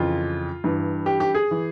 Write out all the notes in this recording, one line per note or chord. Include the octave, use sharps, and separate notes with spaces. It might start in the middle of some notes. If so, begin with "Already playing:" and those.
Already playing: F2 C#3 E3 F4
G2 E3
G4
G4
G#4
E3